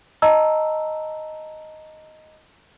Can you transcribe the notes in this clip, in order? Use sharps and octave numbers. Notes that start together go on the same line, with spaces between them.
D#5 A5 A#5 E6